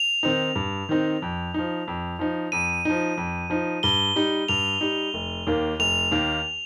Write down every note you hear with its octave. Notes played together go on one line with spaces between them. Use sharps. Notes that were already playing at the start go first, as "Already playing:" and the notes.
Already playing: F7
D#3 C4 D#4
G2
D#3 C4 D#4
F2
F3 D#4
F2
F3 D#4
F2 D#7
F3 D#4
F2
F3 D#4
G2 G7
G3 D#4
G2 F7
G3 D#4
F1
D#2 D#3 A#3
F1 F7
D#2 D#3 A#3